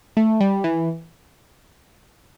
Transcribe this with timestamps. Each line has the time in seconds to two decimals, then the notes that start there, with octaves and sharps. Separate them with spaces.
0.17 A3
0.40 G3
0.64 E3